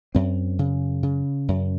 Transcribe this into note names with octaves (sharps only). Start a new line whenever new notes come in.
F#2 C4
C#3
C#3
F#2